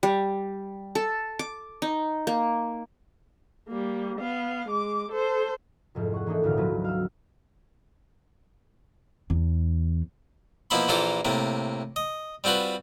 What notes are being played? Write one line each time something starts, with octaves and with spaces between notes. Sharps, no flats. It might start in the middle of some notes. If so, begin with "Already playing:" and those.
G3
A4
D6
D#4
A#3
G3 A#3
B3 F5
G#3 D6
A4 C5
C2 F2 G#2
F#5 C#6
E3 A#3 D4 D#4 A4
G#1 D2 A#2 D#4 F5
F3 F#3 C4 F4 F#4 B4
F5 E6
E2
B2 F3 A#3 E4 B5 C6
A#1 E3 A#3 F4 A4 C5
A2 C3 A#3
D#5
G3 C4 F4 F#4 B4